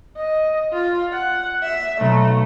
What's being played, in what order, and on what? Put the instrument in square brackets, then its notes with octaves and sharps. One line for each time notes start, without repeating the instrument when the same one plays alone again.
[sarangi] D#5
F4
F#5
E5
[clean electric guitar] B1 [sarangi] A3